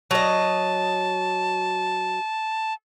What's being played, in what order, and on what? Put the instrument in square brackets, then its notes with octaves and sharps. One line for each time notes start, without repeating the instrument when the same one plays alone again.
[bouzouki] F#3 D#5 [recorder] A5